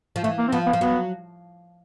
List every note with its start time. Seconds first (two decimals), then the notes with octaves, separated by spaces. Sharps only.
0.16 F3
0.23 E3 A3
0.38 A#3
0.48 C4
0.52 F3 B3
0.66 B3
0.73 F3
0.80 F#3 B3